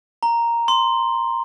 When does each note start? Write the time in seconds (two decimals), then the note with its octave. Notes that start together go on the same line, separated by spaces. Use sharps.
0.23 A#5
0.68 C6